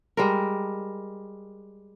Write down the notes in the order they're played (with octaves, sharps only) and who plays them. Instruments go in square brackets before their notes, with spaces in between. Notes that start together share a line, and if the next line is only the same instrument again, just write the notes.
[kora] G3 G#3 A#4